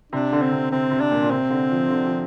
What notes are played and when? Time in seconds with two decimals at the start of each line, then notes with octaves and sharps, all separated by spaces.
0.12 C3 D4
0.32 D3
0.42 C4
0.52 C3
0.71 C3 C4
0.91 C3
1.01 D4
1.11 A#2
1.22 A#2
1.31 C3 C4
1.50 D3
1.71 F3
1.90 D3
2.05 F3